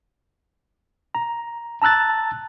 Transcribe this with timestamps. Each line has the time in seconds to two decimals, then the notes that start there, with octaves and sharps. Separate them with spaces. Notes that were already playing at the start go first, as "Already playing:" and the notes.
1.15 A#5
1.82 A5 A#5 E6 F#6 A6